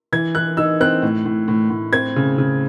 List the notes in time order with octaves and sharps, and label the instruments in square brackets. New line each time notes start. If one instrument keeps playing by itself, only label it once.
[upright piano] E3 G#6
E3 F#6
D#4 E6
C4 F#6
A2
A2
A2
A2
C4 G#6
C#3
C#3